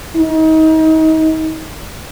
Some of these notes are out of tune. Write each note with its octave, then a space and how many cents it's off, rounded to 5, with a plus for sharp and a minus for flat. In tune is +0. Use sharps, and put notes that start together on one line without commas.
D#4 +30